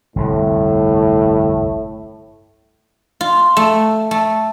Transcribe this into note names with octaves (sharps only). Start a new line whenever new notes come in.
G1 C2 F2 A2
F4
A3
A3